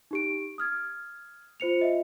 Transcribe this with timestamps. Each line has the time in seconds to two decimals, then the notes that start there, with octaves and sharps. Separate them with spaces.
0.11 D#4 G4 D7
0.58 D#6 F6 G#6
1.60 F4 C5 C#7 F7
1.79 F4 D#5 E5